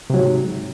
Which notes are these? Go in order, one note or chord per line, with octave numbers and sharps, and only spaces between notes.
G#2 C3 F#3